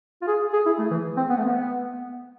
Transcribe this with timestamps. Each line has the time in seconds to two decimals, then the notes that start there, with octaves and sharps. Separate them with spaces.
0.22 F4
0.27 G#4
0.53 G#4
0.66 E4
0.79 A3
0.91 E3
1.17 C4
1.29 B3
1.37 A3
1.45 B3